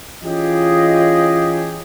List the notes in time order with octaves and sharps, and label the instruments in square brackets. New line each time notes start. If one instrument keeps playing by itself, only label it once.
[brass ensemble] E3 C#4 F4 G4 G#4 D#5